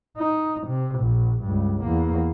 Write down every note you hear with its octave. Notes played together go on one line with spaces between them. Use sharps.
D#4
C3
A#1
C#2 G2
E2 A#3